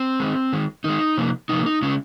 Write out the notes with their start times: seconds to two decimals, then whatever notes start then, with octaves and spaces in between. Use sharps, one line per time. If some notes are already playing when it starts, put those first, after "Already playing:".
Already playing: C4
0.20 D#3 G#3
0.53 D#3 G#3
0.84 D#3 G#3 D#4
1.17 C3 F3 A#3
1.49 C3 F3 A#3 D#4
1.66 D#4
1.82 C#3 G#3 C#4